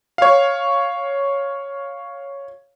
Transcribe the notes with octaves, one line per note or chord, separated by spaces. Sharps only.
C#5 F5